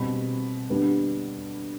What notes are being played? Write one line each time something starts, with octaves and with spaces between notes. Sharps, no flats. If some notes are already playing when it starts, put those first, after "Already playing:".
Already playing: B2 G3 C4 B5
D3 G3 B3 D4